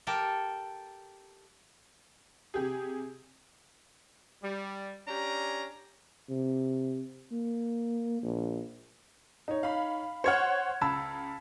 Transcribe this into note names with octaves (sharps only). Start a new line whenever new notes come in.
G4 A4 A#4
C3 G4 G#4
G3
C#4 D4 G4 A#5
C3
A#3
A#1
D#4 C#5
F5 B5
C5 C#5 F#5 F6 G#6 C#7
C#2 A5 B5 E6